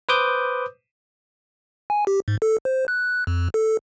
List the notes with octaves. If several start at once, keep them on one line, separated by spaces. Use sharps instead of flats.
B4 C5 D6 D#6 G6
G#5
G4
G#2
A4
C5
F#6
F2
A4